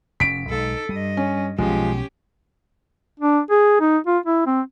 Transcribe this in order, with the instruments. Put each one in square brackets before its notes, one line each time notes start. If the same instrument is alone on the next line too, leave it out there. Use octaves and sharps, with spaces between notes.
[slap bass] F1 A2 C#4 [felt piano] B6 D7
[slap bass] B1 F#3 G#3 [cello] D#4 A4
[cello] G2 D#5 [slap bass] G3
[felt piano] C#4
[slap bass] B1 B2 [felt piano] F3 G#3 [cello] C#4 G4
[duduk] D4
G#4
D#4
F4
E4
C4